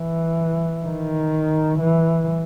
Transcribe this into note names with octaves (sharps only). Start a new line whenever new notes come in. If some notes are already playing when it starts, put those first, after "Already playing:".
Already playing: E3
D#3
E3